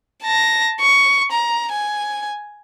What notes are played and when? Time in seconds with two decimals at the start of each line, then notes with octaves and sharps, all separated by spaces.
0.23 A5 A#6
0.81 C#6
1.32 A#5
1.72 G#5